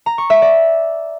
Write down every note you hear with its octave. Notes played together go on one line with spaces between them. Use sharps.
A#5
C#6
E5
D5